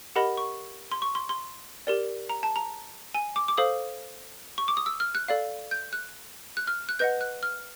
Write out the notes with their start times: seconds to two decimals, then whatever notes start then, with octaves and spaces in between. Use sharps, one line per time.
0.16 G4 A#4 D#5 F#5 B5
0.37 C#6
0.91 C6
1.02 C#6
1.15 C6
1.29 C6
1.87 G4 A#4 D5
2.29 A#5
2.43 A5
2.56 A#5
3.14 G#5
3.36 D6
3.48 D6
3.57 A4 C5 F5 D#6
4.58 C#6
4.68 D6
4.77 D#6
4.86 E6
5.00 F6
5.15 F#6
5.28 A4 D5 F5
5.71 G6
5.93 F#6
6.57 F#6
6.67 F6
6.89 F#6
6.99 B4 D#5 F#5 G6
7.21 F#6
7.43 F6